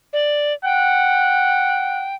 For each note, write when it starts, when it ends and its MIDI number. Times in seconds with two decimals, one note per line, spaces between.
0.13 0.53 74
0.65 2.09 78
0.65 2.15 79